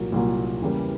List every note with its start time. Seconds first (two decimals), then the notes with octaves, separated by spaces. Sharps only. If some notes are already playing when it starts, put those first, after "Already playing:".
Already playing: C2 A#2 F#3 A#3
0.12 C2 A#2 F#3 A#3
0.62 E2 C#3 E3 G3 A#3